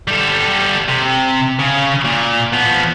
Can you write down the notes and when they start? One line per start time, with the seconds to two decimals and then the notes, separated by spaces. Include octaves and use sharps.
0.08 G3 A4
0.89 C3
1.59 C#3
2.05 A#2
2.53 F3 B3